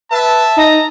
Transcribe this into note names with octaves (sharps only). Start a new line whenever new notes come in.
B4 E5 A5
D#4 D#5 A#5